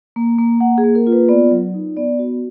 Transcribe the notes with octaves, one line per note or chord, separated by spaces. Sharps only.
A#3
A#3
A#3 F#5
G#4
A#3
A#4
F4
B4
B3 D5
F#3
D#4
B3 D5
F#4